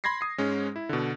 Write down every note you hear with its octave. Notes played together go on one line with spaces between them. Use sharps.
B5 C6 G#6 A#6 C7
D#6 C7
G#2 G#3 C#4
E4
B2 D3